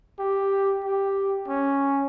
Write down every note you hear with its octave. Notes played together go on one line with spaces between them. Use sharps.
G4
G4
C#4